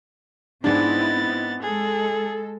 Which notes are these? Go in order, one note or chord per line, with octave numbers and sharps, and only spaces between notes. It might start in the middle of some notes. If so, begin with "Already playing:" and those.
G#2 B3 C4 D4 E4 D#5 A6
G#3 G#4 A4